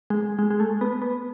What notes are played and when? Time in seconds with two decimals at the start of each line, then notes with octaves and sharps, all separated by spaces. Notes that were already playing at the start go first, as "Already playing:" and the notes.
0.10 G#3
0.39 G#3
0.50 G#3
0.60 A3
0.81 B3
1.02 B3